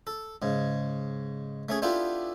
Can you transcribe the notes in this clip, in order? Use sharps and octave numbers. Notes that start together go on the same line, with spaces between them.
A4
G#2 C#3
A3 C#4 G#4
B3 D4 E4 F4 G4 A4